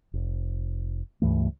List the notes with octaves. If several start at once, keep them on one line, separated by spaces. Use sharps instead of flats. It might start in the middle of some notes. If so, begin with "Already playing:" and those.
F1
C#2 G2 E3 A3